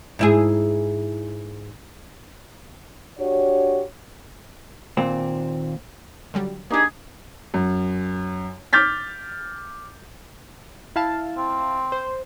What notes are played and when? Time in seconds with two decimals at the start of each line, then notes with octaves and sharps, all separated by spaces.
0.19 G#2 E4 G#4
3.19 D4 F#4 G4 C#5
4.97 D#2 A#2 C4
6.34 D3 F#3 G3
6.70 A#3 D4 D#4 G4 G#4
7.54 F#2
8.73 D6 F6 G6 A6 B6
10.96 E4 F5 A5
11.37 C4
11.92 C5